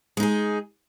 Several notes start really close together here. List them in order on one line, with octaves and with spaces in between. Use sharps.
G#3 D#4 G#4